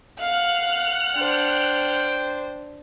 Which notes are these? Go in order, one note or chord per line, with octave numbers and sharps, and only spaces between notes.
F5 F#5 F6 F#6
D4 C5 G5